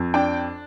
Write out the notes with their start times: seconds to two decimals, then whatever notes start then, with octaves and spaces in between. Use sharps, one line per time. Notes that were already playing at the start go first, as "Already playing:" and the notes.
Already playing: F2
0.14 D4 G5